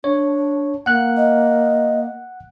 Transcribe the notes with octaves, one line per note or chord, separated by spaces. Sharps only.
D4 C#5
A#3 F#5 F#6
D#5